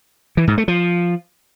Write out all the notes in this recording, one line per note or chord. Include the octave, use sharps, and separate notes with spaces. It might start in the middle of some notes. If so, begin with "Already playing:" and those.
E3
G#2
A3
F3